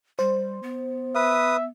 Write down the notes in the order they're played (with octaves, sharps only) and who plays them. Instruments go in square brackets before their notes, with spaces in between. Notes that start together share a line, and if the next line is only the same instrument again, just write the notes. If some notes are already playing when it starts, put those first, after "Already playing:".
[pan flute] G3 [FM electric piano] C5
[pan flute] B3
[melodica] B4 D#6 [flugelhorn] E5